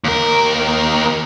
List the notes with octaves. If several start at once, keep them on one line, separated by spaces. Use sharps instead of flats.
D#2 A#4